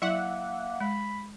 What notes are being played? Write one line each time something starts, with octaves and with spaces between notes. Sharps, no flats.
F#3 A#3 E4 E5 F#5
G#3 B5